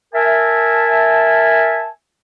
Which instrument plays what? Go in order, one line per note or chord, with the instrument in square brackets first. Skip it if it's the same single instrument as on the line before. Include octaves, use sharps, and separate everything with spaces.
[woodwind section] A#4 E5 G#5 A5